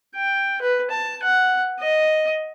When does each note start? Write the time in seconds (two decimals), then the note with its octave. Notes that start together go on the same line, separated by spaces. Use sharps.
0.16 G5
0.61 B4
0.90 A5
1.23 F#5
1.80 D#5